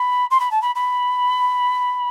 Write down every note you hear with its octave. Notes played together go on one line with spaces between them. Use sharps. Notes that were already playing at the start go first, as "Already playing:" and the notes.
Already playing: B5
C6
B5
A5
B5
B5